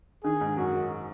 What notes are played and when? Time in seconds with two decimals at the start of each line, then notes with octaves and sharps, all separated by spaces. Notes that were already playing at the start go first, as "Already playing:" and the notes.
0.24 D#3 G#4
0.41 G#2
0.57 F#2 F#4